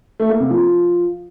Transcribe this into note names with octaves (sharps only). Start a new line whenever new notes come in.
A3
A#3
C3
F3